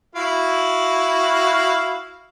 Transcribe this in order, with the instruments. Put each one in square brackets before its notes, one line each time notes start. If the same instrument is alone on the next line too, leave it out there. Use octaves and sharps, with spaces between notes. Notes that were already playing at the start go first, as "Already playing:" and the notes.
[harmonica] E4 F#4 F5